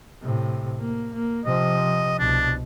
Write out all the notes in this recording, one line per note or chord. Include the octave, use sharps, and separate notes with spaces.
A2 C3
A#3
A#3
C3 F3 D#5
C2 B2 D4